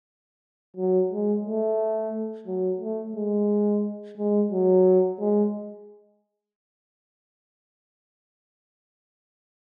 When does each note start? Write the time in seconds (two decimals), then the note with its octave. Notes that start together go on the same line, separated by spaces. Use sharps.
0.77 F#3
1.11 G#3
1.45 A3
2.47 F#3
2.81 A3
3.16 G#3
4.18 G#3
4.52 F#3
5.20 G#3